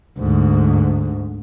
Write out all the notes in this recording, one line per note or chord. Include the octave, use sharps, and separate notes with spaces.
D2 G#2